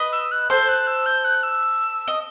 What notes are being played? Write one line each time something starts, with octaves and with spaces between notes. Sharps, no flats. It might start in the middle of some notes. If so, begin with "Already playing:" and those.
Already playing: B4 D#5
E6
F#6
A4 C5 G6
F#6
E6
G6
F#6
E6
D#5